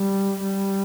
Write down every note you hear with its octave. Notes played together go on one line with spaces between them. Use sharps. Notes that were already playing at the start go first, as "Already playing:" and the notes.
Already playing: G3
G3